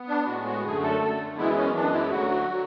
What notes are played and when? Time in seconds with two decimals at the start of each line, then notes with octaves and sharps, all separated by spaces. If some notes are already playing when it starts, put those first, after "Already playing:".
Already playing: B3
0.08 D4
0.27 A2 G#3 B3 F#4
0.46 F#4
0.64 F#2 D3 A3 G#4
0.83 A4
1.00 F#2 D3 A3
1.37 F#2 E3 G#3 B3 E4
1.56 C#4
1.74 F#2 E3 G#3 B3 D4
1.93 E4
2.11 D2 D3 F#3 F#4
2.49 D3 F#3